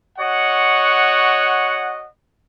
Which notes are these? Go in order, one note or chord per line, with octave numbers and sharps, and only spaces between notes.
F#4 C#5 D#5 F#5